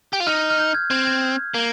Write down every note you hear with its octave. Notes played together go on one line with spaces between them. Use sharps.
G4
F4
D#4 F6
F6
G6
G#6
C4 G#6
G#6
A#3